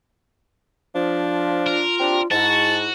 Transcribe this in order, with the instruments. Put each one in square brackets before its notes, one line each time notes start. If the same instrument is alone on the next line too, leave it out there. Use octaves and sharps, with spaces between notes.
[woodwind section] F3 [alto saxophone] D4
[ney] F4 [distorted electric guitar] A#4
[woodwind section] C4 D4 G4
[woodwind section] G#2 [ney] E4 [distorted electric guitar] F#4 [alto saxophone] A5